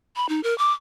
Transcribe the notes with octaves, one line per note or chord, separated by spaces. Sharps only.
B5
D#4
A#4
D6